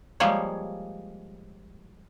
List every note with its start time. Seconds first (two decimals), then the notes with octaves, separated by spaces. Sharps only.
0.20 F3 G3 G#3 A#3 C#5